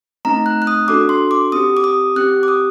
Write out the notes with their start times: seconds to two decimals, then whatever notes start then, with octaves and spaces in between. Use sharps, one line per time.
0.25 A3 C4 D#4 A#5
0.46 F#6
0.62 F#6
0.67 D#6
0.88 D4 F#4 A4 D6
1.09 C6
1.31 D6
1.52 C4 G4 D#6
1.77 D6
1.84 D#6
2.16 C4 G4 F#6
2.43 D6
2.48 D#6